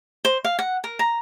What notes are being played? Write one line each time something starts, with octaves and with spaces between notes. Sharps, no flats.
C5
F5
F#5
A#4
A#5